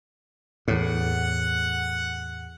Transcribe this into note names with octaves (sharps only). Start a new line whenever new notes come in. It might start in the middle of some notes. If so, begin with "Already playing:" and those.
E2 A2 F#5